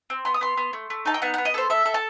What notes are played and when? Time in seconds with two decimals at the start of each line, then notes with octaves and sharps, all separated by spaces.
0.10 C4
0.25 B3 C6
0.34 D#6
0.41 B3 C6
0.57 B3
0.73 A3
0.90 A3
1.05 D#4 A5
1.14 G5
1.22 B3 F#5
1.34 B3 F#5
1.45 D#5
1.54 A4 C5
1.70 A4 E5
1.86 A4
1.94 A5